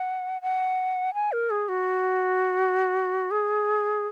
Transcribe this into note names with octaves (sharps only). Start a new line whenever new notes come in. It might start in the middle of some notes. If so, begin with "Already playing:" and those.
Already playing: F#5
F#5
G#5
A#4
G#4
F#4
G#4